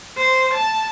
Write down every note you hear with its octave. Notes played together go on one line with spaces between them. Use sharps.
C5
A5